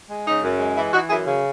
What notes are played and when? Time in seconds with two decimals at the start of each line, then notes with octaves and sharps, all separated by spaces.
0.10 G#3
0.25 C#3 D#4
0.43 F#2
0.59 G#3
0.76 E3 E4
0.93 E3 D#4 F#4
1.09 F#2 E4 G#4
1.27 C#3